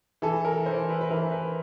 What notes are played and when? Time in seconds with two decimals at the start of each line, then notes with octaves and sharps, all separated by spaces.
0.22 E3 A4
0.45 A#4
0.66 E3 C5
0.89 B4
1.01 B4
1.11 E3 A#4
1.32 B4